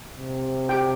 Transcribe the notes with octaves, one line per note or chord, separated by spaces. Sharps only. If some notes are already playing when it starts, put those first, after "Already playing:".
C3
G4 G5